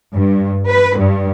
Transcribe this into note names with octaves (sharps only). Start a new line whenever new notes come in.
G2
B4
G2